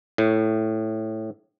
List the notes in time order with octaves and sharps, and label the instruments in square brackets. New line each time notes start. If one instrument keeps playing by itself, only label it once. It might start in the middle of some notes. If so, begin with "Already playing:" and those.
[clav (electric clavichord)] A2